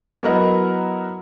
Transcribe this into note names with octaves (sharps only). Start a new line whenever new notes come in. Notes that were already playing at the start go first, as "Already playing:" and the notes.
F#3 B3 E4 A#4 D#5 F#5